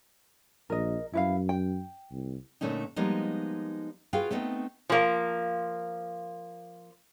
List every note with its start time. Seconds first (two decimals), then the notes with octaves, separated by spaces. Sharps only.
0.70 A#1 A#4 D#5
1.13 F#2 E4 B4 F5
1.49 G5
2.11 C2
2.61 A#2 D3 A3 C#4 D#4
2.96 F3 G3 G#3 A#3 B3 D#4
4.13 F4 F#4 G#4 B4 F5 G5
4.31 A3 B3 C4 D#4
4.90 F3 A#3